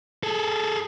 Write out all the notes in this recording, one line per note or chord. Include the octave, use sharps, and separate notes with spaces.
G#4 A4